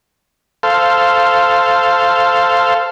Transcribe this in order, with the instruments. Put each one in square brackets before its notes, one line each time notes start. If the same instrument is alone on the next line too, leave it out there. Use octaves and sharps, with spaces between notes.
[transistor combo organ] A4 C5 F5